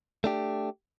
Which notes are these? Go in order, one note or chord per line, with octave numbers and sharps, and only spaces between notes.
A3 D4 G4